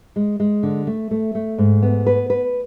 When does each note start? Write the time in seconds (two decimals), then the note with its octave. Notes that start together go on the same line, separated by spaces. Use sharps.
0.16 G#3
0.40 G#3
0.63 D3
0.87 A3
1.11 A3
1.35 A3
1.58 G#2
1.82 B3
2.06 B4
2.30 B4